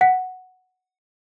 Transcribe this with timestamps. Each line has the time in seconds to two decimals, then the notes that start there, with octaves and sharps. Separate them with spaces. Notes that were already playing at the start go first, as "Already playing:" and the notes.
0.01 F#5 B6